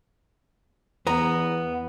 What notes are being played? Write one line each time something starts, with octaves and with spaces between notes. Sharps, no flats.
E2 B3 A#5